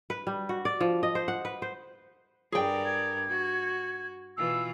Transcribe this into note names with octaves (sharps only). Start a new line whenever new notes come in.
B4
G3
F#4
D5
F3
D#5
C5
F#5
B4
C5
G2 G#4 A#4 D5 G5
G#6
F#4
B2 E3 F4 E6